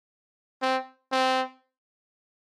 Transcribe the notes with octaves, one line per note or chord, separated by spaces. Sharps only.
C4
C4